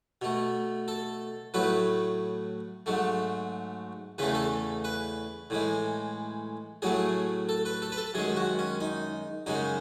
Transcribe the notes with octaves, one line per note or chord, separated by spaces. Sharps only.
B2 A3
A4
A2 F#3 A3 B4
G#2 F#3 A3
E2 C#3 E3 A3 B4
A4
B4
A2 E3 G#3
A2 F#3 A3 G#4
A4
B4
A4
B4
A4
F#2 D#3 G#3 G#4
F#4
C#4
D#4
F#2 C#3 G#3 D#4